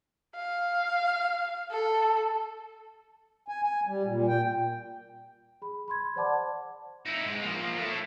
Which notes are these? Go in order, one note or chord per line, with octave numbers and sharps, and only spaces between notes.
F5
A4
G#5
G#5
G3
A#2
G5
G#4 B5
B5 C6 G#6
C5 D5 F#5 A5 D6
D#4 E4
G#2 G#3
F3 A#3
A3 E4